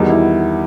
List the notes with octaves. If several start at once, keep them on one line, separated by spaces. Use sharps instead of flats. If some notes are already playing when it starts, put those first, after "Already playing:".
Already playing: E2 D#3 G3 D#4 F#4
E4